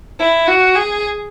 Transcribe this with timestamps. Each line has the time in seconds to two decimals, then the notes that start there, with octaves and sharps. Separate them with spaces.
0.19 E4
0.48 F#4
0.75 G#4